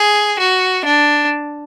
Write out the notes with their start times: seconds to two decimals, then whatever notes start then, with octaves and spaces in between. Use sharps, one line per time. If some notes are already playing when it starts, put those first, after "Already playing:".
Already playing: G#4
0.39 F#4
0.85 D4